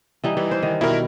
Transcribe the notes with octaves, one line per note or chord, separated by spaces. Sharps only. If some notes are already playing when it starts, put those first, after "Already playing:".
E3 G3 D#4
E3 G3
C5
D#3
B2 G3 E4 A#4